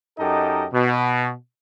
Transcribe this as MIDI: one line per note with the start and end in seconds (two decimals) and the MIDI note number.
0.19 0.66 42
0.19 0.66 63
0.19 0.66 67
0.19 0.66 69
0.19 0.66 70
0.19 0.66 75
0.73 1.32 47